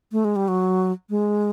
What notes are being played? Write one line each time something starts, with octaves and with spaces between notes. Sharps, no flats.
A3
G#3
G3
F#3
G#3